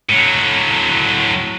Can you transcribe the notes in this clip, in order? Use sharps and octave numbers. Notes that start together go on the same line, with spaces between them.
A2 F#3